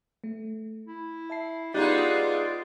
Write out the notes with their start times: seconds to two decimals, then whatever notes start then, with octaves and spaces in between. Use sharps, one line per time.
0.24 A3
0.87 E4
1.30 E5 A5 C7
1.74 G#3 B3 D#4 F4 G4 D5 F#6